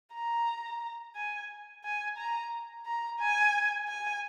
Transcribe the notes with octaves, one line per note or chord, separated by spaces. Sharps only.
A#5
G#5
G#5
A#5
A#5
G#5
G#5